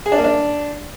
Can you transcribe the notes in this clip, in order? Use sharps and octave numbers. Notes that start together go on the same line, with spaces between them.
G#4
D4
A#3
D4